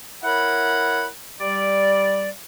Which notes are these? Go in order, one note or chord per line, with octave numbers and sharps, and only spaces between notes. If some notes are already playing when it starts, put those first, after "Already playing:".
E4 A#4 C#5 F#5 B5
G3 D5